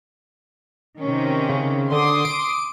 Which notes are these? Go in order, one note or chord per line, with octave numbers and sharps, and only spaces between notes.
C3 D#3 C#4
C#3
D3 C6 D6 D#6
D7